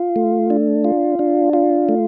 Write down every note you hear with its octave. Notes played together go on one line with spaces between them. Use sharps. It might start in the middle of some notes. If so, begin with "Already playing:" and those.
Already playing: F4
A3
D4
F4
D4
F4
A3